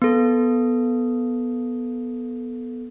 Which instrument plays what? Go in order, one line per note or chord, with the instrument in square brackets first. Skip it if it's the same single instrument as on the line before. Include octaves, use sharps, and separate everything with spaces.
[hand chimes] B3 A4